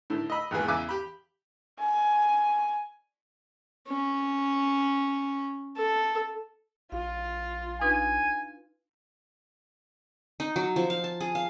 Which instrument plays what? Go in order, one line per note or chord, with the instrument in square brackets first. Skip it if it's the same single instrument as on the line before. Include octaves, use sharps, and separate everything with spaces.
[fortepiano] A2 D3 D#3
D#5 B5 E6
G#1 E2 A#2 G#4 B4
E2 C#3 E5 G#5 D6
G4 B5
[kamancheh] G#5
[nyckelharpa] C#4
A4
[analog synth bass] A#1 [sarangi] F4 [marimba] F5
[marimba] D4 D#4 B4 [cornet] G#5
[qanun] D#4
F#3
F3
F5
A5
G#4
F5